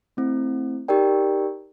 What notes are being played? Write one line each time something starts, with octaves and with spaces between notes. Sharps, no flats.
A3 C4 E4
D#4 G4 A#4 D5 G5